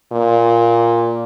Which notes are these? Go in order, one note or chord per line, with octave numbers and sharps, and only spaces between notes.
A#2